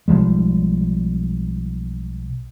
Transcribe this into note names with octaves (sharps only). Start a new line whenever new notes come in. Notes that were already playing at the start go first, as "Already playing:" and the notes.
B1 F3 G3 G#3